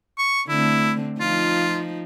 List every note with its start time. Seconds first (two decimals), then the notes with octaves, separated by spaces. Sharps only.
0.18 C#6
0.49 D3 A3 C4 E4
1.20 F3 D#4 F4